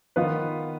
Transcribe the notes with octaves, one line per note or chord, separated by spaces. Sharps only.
D#3 B3 F4 B4